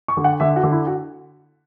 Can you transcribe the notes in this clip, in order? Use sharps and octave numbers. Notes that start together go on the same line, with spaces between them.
C#6
D3
F#5
D3 E5
F#4
D3
E4
F#4